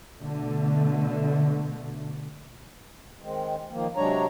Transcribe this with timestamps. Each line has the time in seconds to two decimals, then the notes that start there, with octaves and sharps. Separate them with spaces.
0.18 B2 D3 A3
3.22 D#3 G#3 C4
3.71 D#3 F3 A#3
3.96 C3 F#3 G#3 D4 C#5 A#5